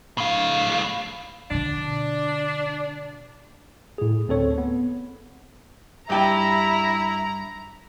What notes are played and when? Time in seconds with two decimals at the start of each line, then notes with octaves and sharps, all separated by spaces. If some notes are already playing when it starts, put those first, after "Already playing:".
0.18 A2 F5
1.51 B2 D3 D4
3.98 A2 G#4
4.28 D2 C4 A4 C#5
4.58 B3
6.10 G2 E4 E5 G5 A5 A#5